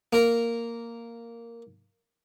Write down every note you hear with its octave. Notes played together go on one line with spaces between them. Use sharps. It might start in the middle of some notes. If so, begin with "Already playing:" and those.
A#3 A#4